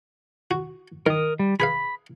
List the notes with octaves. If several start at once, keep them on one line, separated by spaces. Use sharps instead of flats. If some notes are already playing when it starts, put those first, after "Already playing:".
F#4
D#3 A#4 D#6
G3
G#4 B4 F5 B5